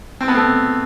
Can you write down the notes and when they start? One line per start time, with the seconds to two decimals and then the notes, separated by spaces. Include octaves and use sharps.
0.21 C4
0.28 B3
0.35 A3 C4